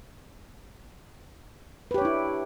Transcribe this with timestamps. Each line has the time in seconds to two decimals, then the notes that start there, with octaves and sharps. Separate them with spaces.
1.91 B4
1.94 G4
1.98 C#5
2.01 D4
2.05 E4